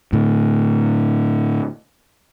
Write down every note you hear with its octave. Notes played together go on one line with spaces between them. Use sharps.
A2 D3